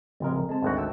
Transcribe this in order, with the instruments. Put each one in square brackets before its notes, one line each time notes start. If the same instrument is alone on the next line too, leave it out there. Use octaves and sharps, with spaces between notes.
[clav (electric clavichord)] A1 G#3 A#4 [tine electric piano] C#3 F3 C4
[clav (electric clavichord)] G#3 [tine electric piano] C4 A4 A5
[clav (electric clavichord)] G#1 D2 F#4
[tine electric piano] G5 A5 E6